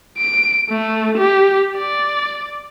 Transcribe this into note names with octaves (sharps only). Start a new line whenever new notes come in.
D7
A3
G4
D5